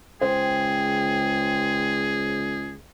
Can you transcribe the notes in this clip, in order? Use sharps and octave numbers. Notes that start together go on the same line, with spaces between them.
C#2 G#4 C5 G5